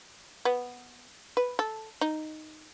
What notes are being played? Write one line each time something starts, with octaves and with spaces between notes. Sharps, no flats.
B3
B4
A4
D#4